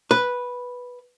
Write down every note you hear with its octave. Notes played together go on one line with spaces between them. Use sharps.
B4